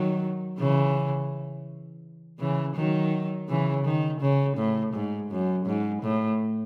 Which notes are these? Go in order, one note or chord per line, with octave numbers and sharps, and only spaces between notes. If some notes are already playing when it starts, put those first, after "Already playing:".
Already playing: D#3 F#3
C#3 E3
C#3 E3
D#3 F#3
C#3 E3
D#3
C#3
A2
G#2
F#2
G#2
A2